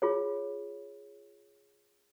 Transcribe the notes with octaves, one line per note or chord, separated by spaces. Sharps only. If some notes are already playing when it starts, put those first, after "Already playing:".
F4 G#4 C#5